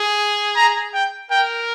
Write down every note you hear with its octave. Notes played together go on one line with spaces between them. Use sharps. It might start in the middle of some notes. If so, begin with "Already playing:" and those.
Already playing: G#4
A#5
G5
A#4 G5